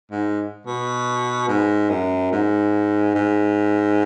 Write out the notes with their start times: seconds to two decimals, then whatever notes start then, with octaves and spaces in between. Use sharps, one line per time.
0.12 G#2
0.67 B2
1.49 G#2
1.89 F#2
2.32 G#2
3.15 G#2